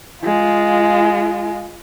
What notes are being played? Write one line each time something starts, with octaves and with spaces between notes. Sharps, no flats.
G#3 F4